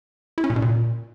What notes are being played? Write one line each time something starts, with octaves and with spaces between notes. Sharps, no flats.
E4
C#4
A#2
B2
A#2